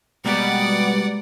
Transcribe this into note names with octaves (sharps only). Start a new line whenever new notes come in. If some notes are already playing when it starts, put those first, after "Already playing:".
B2 G3 G#3 A#3 B3 D5 F#5